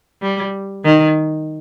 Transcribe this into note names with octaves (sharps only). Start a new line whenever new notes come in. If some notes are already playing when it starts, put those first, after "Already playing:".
G3
D#3